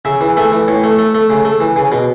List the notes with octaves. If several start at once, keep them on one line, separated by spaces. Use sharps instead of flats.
C#3 E5
E3
A3 E5
E3
A2 C#5
A3
A3
A3
C#3
A3
E3
C#3
B2